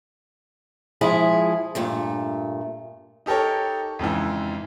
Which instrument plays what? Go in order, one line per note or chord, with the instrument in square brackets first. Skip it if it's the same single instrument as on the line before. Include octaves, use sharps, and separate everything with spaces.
[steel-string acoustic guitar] F3 G#3 E4 G#4
G2 A#2 A3
[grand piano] D#4 G4 A4 A#4 C#5
F2 G#2 C#3 E3